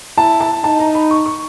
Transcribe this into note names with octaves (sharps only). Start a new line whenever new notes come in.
E4 A5
A5
D#4 A5
A#5
B5
C#6
C#6